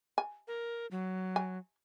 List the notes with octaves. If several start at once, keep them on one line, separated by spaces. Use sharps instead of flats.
G#5
A#4
F#3
G#5